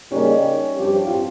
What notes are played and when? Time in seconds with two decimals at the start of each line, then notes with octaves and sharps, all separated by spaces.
0.11 C#3 G3 A#3 C#4 D#4 G4
0.75 G2 F3 C4 G4
1.07 F4